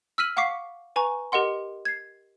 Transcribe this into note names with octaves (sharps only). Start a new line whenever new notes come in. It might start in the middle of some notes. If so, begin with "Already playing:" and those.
E6 F6 B6 D#7 F#7
F5 F#5 C#6 D6 B6 C7
B4 G#5 A#5 C#6
G4 A#4 D#5 F#5 C6
G#6 C7